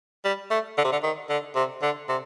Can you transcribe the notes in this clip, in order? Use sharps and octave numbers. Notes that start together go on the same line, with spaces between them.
G3
A3
D3
C3
D3
D#3
D3
C3
D3
C3